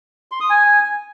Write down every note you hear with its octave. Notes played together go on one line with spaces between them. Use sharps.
C6
D#6
G#5